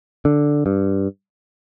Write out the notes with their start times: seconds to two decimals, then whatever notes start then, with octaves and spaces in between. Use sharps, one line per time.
0.25 D3
0.66 G2